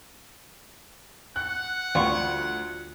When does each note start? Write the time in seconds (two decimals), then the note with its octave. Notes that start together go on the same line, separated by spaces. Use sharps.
1.36 F#5 F#6
1.95 D2 G3 F4 C#6